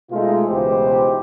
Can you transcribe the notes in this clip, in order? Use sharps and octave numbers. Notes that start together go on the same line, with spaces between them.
B2 G#3 A3 D#4 F4
C#2 B2 E3 D#4 G4 C5